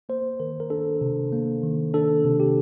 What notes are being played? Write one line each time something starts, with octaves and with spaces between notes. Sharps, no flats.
A#3 C5
D#3 A#4
A#4
D4 A4
C3
A#3
D#3
D4 A4
C3
G4